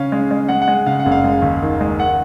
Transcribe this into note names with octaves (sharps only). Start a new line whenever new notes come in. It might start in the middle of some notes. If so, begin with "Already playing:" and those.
Already playing: C#3 C#4 F5
G#3
G#3
G#3 F#5
F#5
G#3
C#3 F5
F#5
F#1
F5
G#3
D#2
D#3
G#3
D#3 F#5